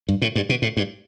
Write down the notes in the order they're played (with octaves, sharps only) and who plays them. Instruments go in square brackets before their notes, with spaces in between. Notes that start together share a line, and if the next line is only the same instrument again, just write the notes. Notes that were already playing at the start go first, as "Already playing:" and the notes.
[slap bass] G2
A2
G2
B2
A2
G2